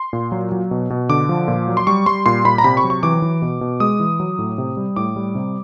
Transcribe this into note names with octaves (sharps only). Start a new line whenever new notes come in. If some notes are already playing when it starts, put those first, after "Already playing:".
Already playing: C6
A#2
F#3
F#3
B2
B2
D3 D6
F3
A#2
F#3
C6
G3 C#6
G3 C6
A#2 C6
A#2 B5
A#5
C3 B5
C#6
F#3
C#6
E3 D6
E3
B2
B2
G#3 D#6
E3
F#3
A2
C3
G3
A2 D6
G3
C3